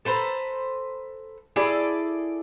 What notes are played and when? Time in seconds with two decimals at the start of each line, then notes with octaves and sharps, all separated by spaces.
0.05 A4 B4 C5 A#5
1.56 E4 G#4 A4 D5